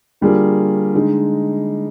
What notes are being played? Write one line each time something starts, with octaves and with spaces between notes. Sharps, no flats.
D3 G3 A#3 F4 G#4
D3 G#3 D#4